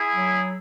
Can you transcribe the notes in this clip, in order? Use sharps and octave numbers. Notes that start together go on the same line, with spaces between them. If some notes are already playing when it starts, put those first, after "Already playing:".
Already playing: E4 G#4
F#3